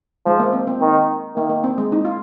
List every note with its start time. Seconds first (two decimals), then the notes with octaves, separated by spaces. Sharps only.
0.26 F3 G#3
0.40 A#3
0.53 C4
0.67 C4
0.81 D#3
1.36 D#3 A#3
1.50 A#3
1.64 C4
1.78 G#3
1.92 D#4
2.05 F4